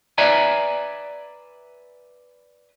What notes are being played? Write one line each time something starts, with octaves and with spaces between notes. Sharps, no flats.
B4 D5 E5 G#5 A#5